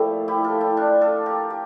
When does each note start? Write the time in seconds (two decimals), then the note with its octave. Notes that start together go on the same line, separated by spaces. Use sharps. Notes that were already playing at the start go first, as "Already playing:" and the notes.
Already playing: A#2 F3 A3 E4 G4
0.28 E4 G4
0.44 F4 A4
0.60 E4 G4
0.77 D4 F4
1.01 F4 A4
1.26 G4 A#4
1.50 G4